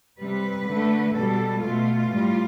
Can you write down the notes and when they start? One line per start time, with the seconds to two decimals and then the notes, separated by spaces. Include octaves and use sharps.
0.20 C3 G3 B4
0.67 D3 A3
1.15 B2 G3 A4
1.62 B2 A3 F4
2.10 A2 G3